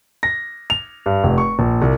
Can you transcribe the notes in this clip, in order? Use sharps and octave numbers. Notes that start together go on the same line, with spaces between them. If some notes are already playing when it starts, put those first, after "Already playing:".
A#6
F7
G2
F1
C#6
A#1
C2